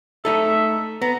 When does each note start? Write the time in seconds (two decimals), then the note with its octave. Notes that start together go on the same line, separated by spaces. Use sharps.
0.25 A3 D#4 A4 E5
1.02 B3 A#5